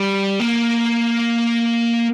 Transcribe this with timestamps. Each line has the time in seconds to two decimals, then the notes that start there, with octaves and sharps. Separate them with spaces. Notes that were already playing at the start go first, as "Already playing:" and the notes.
Already playing: G3
0.40 A#3